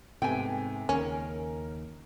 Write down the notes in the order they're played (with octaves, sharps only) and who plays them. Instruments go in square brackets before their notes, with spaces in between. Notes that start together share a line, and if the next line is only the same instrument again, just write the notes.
[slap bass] G#2 [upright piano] C3 A3 B3 [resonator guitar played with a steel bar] G5 G#5
[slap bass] D#2 C#3 [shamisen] C#4 [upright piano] A#4